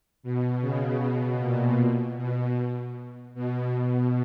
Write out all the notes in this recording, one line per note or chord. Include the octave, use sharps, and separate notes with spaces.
B2
C#3
B2
A#2
B2
B2
B2